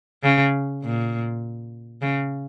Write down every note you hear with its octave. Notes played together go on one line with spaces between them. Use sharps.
C#3
A#2
C#3